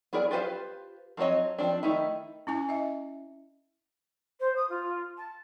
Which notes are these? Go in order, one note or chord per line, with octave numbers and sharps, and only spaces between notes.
B3 E4 G#4 A#4 D5
F4 G4 B4 C5 F5
F3 F#3 C4 C#5 D#5
F3 C4 D4
D#3 A3 D#4 E4
C#4 E4 G#5
D#5 E5
C5
D#6
F4
A5